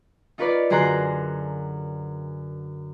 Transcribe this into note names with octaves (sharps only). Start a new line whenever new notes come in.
D#4 F4 A#4 B4 C#5 D5
F#2 D3 G#4 A#5 C6 F#6